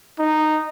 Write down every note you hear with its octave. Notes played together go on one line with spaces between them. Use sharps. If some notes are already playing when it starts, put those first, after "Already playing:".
D#4